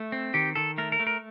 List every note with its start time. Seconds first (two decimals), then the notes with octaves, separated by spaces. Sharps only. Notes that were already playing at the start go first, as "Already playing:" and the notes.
Already playing: A3
0.12 C4
0.34 D#3 G4
0.56 D#3 A4
0.78 A3 A#4
0.92 A#4
1.00 A3
1.07 A#4